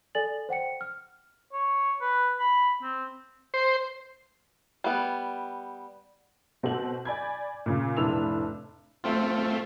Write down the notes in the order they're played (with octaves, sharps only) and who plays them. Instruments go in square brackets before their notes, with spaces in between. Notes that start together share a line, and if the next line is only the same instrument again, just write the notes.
[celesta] A4 D5 G#5 A6 F#7
C5 F#5 G5 C#7
F6
[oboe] C#5
B4
B5
C4
[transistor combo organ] C5
[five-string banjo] G3 B3
[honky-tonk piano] B2 C4 F#4 A4 F#7
D5 G#5 B5 G6 G#6
A#2 C#3
F1 A2 D4 B4 E6 F7
[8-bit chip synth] A3 C4 F4